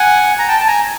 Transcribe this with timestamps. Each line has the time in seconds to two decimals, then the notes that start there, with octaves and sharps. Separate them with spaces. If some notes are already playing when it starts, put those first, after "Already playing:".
Already playing: F#5 G#5
0.39 A#5
0.48 G5 A5
0.60 A5
0.67 G#5 A#5